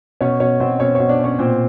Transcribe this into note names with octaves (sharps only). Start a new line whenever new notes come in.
B2 C#4 C#5
B2 C#4 C#5
B2 C4 C5
B2 C#4 C#5
B2 C#4 C#5
D4 D5
B2
C#4 C#5
A#2 C4 C5